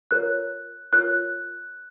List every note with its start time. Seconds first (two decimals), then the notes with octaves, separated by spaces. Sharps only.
0.11 F4 A#4 C#5 F#6
0.93 F4 A#4 C#5 F#6